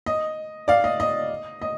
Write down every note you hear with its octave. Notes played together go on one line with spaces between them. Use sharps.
D#5
D5 F5
D#5
D#5
D#5